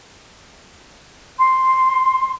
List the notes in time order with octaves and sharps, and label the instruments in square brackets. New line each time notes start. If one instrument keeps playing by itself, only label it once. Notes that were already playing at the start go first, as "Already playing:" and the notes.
[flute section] C6